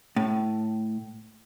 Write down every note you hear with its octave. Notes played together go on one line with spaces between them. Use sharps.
A2